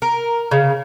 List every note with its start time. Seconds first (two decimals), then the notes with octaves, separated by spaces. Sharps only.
0.02 A#4
0.51 C#3